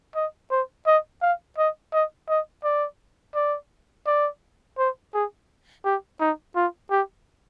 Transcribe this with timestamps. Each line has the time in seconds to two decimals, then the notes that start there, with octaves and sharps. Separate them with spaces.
0.15 D#5
0.51 C5
0.87 D#5
1.22 F5
1.58 D#5
1.93 D#5
2.29 D#5
2.64 D5
3.35 D5
4.07 D5
4.78 C5
5.14 G#4
5.85 G4
6.20 D#4
6.56 F4
6.91 G4